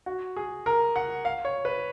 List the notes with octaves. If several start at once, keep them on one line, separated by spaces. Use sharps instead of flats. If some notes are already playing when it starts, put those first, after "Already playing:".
F#4
G#4
A#4
F#5
F5
C#5
B4